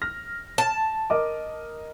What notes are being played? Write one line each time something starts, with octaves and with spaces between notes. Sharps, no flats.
F6 A#6
A5
A#4 D#5 D6